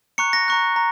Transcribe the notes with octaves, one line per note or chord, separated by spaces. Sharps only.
A#5 C#6 F#6 C#7
A#6
A#5 C#6 F#6
A#5